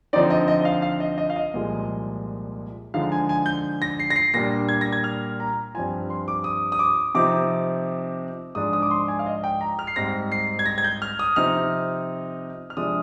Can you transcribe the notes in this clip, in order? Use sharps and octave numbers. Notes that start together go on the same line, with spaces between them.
D3 F3 C4 D#4 D5
D#5
D#5
D#5
F5
F5
D#5
D#5
F5
D#5
C2 A#2 F3 G#3
D3 F3 G#3 D#4 F5
G#5
G#5
G6
A#6
C7
A#6
C7
A#2 G3 D4 A#6
G#6
A#6
G#6
F6
A#5
G2 F3 C4 F4 G#5
C6
D6
D#6
D#6
D6
C3 F3 C4 D#4 D6
G#2 F3 G#3 D4 F4 D#6
D#6
D6
C6
G#5
F5
D#5
G5
A#5
F6
C7
G#2 G3 C4 A#6
C7
G#6
A#6
G#6
G6
F6
D#6
C3 F3 C4 D#4 F6
F6
C3 F3 G#3 D4 D#6